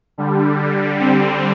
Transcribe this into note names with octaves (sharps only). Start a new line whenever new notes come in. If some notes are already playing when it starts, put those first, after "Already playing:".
D3 G3
G3 C4